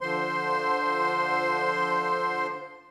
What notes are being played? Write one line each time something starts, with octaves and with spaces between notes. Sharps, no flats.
D3 F3 C5 C6